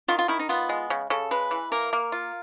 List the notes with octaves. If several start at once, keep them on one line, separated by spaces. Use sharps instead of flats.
D#3 F4
F4
D#3 E4
D#4
B3 F4
G#3
C#3
C#3 A4
G#3 B4
E3
A#3 A#4
A#3
F4